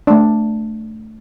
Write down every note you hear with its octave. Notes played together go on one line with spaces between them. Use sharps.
A3 D4